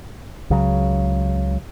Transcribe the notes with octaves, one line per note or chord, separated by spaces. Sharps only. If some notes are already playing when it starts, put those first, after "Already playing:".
C#2 C#3 F#3